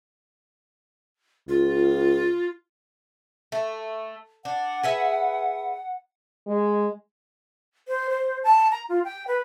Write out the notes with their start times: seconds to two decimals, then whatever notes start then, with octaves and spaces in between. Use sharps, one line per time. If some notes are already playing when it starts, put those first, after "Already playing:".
1.49 C#2 F4
3.52 A3
4.45 D4 F#5
4.83 G#4 B4 E5
6.47 G#3
7.88 C5
8.10 C5
8.44 A5
8.71 A#5
8.89 F4
9.05 G5
9.28 B4